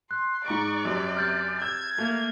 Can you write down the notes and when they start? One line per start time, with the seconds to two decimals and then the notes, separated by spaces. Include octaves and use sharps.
0.11 C6 F#6
0.46 G#2 D5 A#5 C#6 D7
0.85 F#2 C3
1.17 F6 G6 A6
1.62 E6 G#6
1.98 A3 A#3